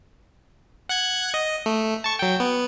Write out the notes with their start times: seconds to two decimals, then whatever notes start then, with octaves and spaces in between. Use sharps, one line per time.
0.89 F#5 F#6 G#6
1.34 D#5
1.66 A3
2.04 A5 C#6
2.19 F#3 G5
2.40 B3